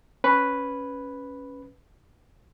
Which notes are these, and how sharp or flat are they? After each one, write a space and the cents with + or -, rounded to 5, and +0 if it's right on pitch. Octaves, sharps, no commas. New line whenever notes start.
C#4 +0 B4 +0